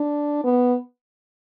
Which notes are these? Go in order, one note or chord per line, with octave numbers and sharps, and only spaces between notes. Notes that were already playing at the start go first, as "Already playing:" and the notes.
Already playing: D4
B3